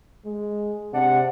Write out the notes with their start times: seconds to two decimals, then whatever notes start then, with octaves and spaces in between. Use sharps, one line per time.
0.25 G#3
0.93 C3 D4 D5 F#5